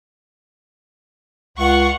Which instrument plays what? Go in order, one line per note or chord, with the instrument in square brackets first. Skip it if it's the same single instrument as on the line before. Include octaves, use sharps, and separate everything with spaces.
[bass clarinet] C#2 [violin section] F4 F#5 C#6